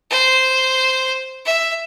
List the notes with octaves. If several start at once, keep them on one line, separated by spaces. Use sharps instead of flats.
C5
E5